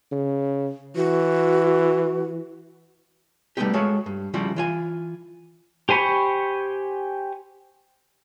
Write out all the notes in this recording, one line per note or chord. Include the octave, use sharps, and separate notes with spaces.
C#3
E3 F#4
G3 A3 B3 C4 D#4 G4
G#3 F#4 A4 C#5 E5 F5
G2
C#3 F3 G3 E4 F#4
E3 F4 G#5
G4 C5 G#5 B5 C#6